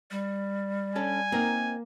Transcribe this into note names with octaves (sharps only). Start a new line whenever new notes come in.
G3
C#4 D4 A4 G#5
A#3 C4 D#4 A#4